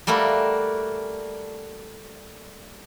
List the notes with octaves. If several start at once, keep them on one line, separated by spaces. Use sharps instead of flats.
G3 A3 A#3 F#4